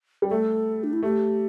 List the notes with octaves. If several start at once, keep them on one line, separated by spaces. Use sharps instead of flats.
G3
A3 A4
D4
E4
A3 G4